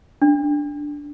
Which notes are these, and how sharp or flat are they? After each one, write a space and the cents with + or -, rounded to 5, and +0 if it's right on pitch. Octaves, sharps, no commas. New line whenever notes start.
D4 -5